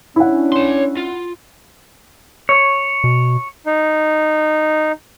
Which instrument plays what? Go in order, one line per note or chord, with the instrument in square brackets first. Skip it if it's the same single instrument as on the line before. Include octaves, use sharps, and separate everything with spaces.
[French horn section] C#4 D4 [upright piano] E4 F#5
[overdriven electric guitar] C#5 C6
F4
[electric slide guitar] C#5
[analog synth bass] B2
[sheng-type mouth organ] D#4